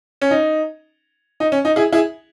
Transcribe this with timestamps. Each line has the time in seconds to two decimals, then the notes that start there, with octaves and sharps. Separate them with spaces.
0.22 C#4
0.31 D#4
1.40 D#4
1.52 C#4
1.65 D#4
1.76 E4 G#4
1.92 E4 G#4